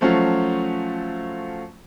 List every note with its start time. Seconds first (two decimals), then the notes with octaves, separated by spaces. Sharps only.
0.01 F3 F#3 A3 C#4 F4 F#4